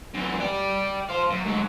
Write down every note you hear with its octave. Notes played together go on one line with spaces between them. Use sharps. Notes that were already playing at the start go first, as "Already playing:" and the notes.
F#2 E3
D5 G5
C5 F5
F#2
G#2 F#3